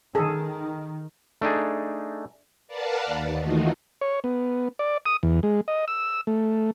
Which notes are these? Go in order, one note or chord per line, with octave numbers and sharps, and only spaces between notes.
D#3 G#4 A4
A3 D4 D#4 G#4
A#4 B4 D5 F5 F#5 A5
D#2
D#3 E3 A3 D#4 F4 F#4
C#5
B3
D5
D#6
E2
G#3
D#5
E6
A3